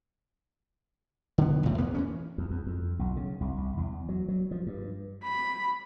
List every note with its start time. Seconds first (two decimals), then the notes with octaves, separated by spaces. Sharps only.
1.38 D3 B3
1.63 B1 A2
1.78 E2 A#3 B3
1.95 E3 F#3 C#4
2.38 E2
2.51 E2
2.66 F2
2.99 B1
3.16 C#3
3.41 C2
3.58 C2
3.77 E2
4.09 F#3
4.28 F#3
4.51 F3
4.67 G2
5.24 B5